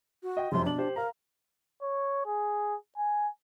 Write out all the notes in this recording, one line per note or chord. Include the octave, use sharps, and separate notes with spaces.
F#4
D#5 G5
F1 F#2 F3 C6
B2 D4 F#7
G4 C5
A#4 F5 A#5
C#5
G#4
G#5